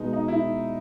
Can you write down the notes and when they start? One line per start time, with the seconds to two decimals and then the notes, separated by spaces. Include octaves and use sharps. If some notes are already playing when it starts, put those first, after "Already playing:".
Already playing: B2 G#3 B3 D#4
0.13 D#4
0.28 E4